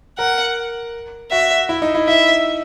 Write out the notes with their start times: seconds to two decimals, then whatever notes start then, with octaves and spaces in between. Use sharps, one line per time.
0.18 A#4 F#5
1.31 F#4 E5
1.69 E4
1.82 D#4
1.95 E4
2.08 E4 E5